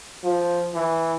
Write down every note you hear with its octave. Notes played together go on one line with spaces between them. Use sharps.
F3
E3